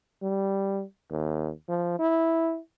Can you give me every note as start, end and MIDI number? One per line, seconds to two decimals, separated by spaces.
0.23 0.83 55
1.11 1.51 39
1.69 1.95 53
1.99 2.59 64